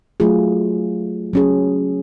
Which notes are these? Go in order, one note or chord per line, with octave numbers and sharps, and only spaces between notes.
F#3 A3 F4 G#4
F#3 C#4 G#4